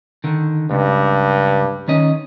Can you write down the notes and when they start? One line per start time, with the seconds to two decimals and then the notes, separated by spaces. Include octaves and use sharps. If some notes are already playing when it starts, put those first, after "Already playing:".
0.24 D3 D#3
0.71 C#2 G2
1.88 D#3 C#4 D#5